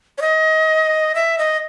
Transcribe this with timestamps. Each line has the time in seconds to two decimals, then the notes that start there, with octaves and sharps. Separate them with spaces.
0.18 C#5
0.22 D#5
1.15 E5
1.38 D#5